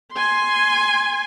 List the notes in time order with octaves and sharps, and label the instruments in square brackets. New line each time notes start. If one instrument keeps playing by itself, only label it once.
[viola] G#5 C6